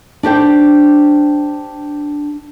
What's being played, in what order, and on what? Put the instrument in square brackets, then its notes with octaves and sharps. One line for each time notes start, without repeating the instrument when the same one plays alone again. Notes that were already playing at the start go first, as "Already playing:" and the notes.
[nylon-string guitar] D4 G4 C5 G5